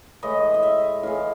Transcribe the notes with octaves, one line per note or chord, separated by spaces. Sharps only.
A2 E3 G#3 D#5
D#5
E5
A2 E3 G#3 F5